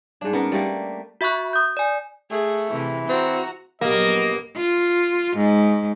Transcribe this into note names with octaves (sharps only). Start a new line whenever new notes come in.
G#2 G3 D4 G#4
B3 C#4 A#4
G3 A3 A#3
F#4 E5 B5 C#6 F#6
D#6 G6
D5 G#5
A3 G#4
C3 E3
C4 F#4 A#5
A#1 F#3 A#3 B3 G4 A#4 D#5
F4
G#2